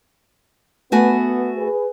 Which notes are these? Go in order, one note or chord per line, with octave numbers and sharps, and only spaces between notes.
A3 B3 F#4 G#5
G#4 B4